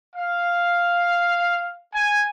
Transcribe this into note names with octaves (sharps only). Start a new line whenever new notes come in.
F5
G#5